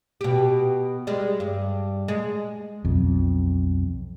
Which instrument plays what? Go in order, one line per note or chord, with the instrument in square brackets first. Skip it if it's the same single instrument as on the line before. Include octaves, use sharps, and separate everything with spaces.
[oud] B2 G4
G3 G#3
G2
G#3
[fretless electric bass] B1 F2